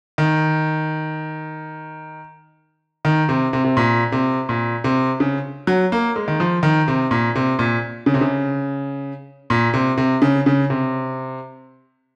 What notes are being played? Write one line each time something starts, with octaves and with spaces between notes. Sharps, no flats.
D#3
D#3
C3
C3
C3
A#2
C3
A#2
C3
C#3
F#3
A#3
G#3
D#3
F3
D#3
C3
A#2
C3
A#2
C#3
C3
C#3
A#2
C3
C3
C#3
C#3
C3